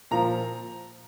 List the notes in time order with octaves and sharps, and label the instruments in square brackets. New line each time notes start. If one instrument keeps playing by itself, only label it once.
[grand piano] A#2 F3 A#5